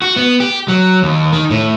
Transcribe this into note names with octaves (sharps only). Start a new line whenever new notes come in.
F#4
B3
G4
F#3
D#2
D#3
A2